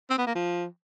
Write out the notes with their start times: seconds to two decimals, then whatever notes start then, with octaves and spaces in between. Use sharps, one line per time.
0.10 C4
0.18 B3
0.27 A#3
0.35 F3